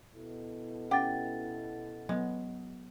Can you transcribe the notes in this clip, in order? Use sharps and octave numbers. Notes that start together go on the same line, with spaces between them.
B2 E4 A4
C#4 G4 F#5 G5 A6
F#3 G#3 B3